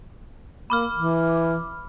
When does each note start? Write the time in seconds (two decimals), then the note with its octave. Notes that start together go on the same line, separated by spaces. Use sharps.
0.70 A#3 B5 D6 F6
0.94 E3